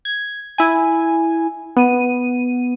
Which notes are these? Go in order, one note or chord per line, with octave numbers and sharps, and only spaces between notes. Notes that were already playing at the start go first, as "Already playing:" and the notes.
G#6
E4 G#5
B3 D#7